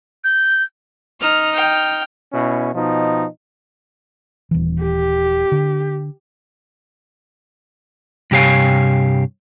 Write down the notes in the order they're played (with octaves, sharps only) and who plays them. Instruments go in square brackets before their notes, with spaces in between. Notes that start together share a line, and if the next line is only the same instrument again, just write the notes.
[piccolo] G6
[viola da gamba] D#4 [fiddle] F6
[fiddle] G5 F6
[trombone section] B2 C#4 E4
B2 F3 D#4
[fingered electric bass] D#1 E3
[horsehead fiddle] G4
[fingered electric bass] D3
[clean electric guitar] G2 C3 G4 C#5 F5 G#5